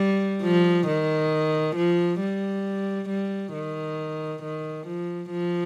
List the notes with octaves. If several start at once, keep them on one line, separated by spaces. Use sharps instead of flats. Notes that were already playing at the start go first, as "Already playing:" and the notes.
Already playing: G3
F3
D#3
F3
G3
G3
D#3
D#3
F3
F3